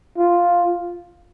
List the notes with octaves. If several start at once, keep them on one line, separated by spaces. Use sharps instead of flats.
F4